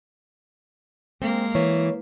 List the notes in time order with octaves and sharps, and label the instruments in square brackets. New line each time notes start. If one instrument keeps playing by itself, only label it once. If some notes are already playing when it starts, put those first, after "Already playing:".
[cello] G#3 A#3 [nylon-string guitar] C4
[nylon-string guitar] E3 [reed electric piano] C#5